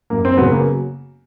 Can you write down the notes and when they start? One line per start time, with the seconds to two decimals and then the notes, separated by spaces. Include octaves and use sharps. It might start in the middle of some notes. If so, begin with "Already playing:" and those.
0.10 F#2 A#3
0.25 C4
0.37 C#3 F#3 B3
0.51 A#3